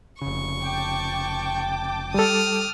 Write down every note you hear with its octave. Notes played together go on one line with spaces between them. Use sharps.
F1 C#3 C#6
G5 A5 D6
G3 A4 D#6 F6